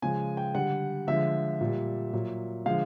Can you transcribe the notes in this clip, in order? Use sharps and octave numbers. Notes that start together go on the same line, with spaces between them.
C#3 F3 G#3 G#5
G5
D3 G3 F#5
D3 F3 G#3 E5
A#2 G3
A#2 F#3
D3 F3 G#3 F5